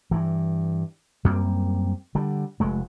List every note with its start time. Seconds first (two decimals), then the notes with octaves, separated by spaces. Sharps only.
0.11 G2 E3
1.25 F#2 G3 A#3 C4
2.15 D3 G3
2.60 F1 G#3 A3